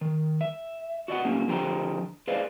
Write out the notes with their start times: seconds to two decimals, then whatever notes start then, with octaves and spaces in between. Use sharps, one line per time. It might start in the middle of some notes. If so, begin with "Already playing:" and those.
0.01 D#3
0.41 E5
1.08 F#4 D5 D#5 F#5
1.24 A#3 C#4 D#4 G4
1.48 D3 F3 G4 C5 G5 A#5
2.28 G#4 B4 C5 D5 D#5 F5